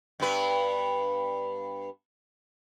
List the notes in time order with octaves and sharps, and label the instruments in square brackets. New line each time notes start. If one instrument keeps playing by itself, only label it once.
[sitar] G2 B3 B4